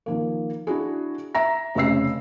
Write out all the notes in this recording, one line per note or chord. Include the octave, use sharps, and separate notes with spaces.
D#3 F3 A#3
D4 E4 F#4 G#4
E5 A#5 A#6
F1 C#3 D#5 E6 C7